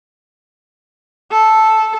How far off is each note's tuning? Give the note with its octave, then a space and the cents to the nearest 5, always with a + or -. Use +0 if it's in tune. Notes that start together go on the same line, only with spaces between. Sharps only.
A4 -5